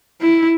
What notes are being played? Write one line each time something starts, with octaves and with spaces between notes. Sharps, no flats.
E4